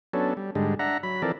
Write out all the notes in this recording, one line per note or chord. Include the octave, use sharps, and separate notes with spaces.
F#3 B3 C#4 D4 A4
G3
G#2 D3 G3 G#3
D4 E5 F#5 A#5
F#3 B5
E3 F3 C4 A4 A#4 D5